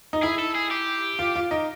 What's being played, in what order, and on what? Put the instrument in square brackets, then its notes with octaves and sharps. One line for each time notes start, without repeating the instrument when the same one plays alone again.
[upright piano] D#4
[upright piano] E4 [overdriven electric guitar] G#4
[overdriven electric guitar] A4
G#4
G4
[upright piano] F4
F4
D#4